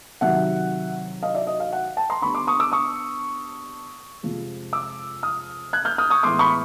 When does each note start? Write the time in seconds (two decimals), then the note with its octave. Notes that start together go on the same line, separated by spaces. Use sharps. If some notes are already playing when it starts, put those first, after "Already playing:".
0.21 C3 D#3 F#3 E5 F#5
1.23 D#5 F5
1.34 D5 E5
1.47 D#5
1.60 D#5 F5
1.72 E5 F#5
1.97 G5 A5
2.10 A#5 C6
2.22 D3 G3 B3 D4 B5 C#6
2.35 C6 D6
2.47 C#6 D#6
2.60 D6 E6
2.72 C#6 D#6
4.23 F2 C3 F3 G#3
4.73 D6 E6
5.23 D#6 F6
5.73 F#6 G#6
5.85 F6 G6
5.98 D#6 F6
6.10 C#6 D#6
6.23 A2 E3 G#3 B3 C6 D6
6.39 B5 C#6